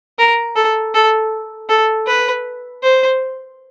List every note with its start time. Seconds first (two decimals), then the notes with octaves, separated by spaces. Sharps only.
0.19 A#4
0.56 A4
0.94 A4
1.69 A4
2.07 B4
2.83 C5